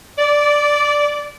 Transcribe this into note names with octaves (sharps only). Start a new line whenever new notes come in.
D5